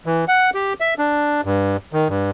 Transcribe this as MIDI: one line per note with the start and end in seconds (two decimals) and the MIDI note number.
0.06 0.25 52
0.28 0.50 78
0.54 0.73 67
0.80 0.94 76
0.98 1.41 62
1.44 1.77 43
1.93 2.08 51
2.09 2.31 43